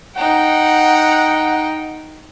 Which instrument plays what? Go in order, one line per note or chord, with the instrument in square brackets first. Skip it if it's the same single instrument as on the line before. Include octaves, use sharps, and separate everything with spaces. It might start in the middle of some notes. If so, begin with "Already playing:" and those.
[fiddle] D#4 G5 [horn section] F#5